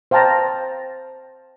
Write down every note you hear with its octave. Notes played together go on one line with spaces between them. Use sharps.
C5 F5 G5 A5 A#5